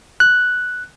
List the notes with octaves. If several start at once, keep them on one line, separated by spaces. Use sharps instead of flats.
F#6